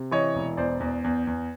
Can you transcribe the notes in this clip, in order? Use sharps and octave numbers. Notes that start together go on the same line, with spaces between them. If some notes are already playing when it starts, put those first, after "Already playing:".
Already playing: C3
E3 C#5 D#5
E1
E2 C5 D5
E2
E2
E2